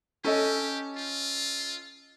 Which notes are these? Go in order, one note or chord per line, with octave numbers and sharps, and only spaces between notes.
C#4 G4 A4 D#5
F4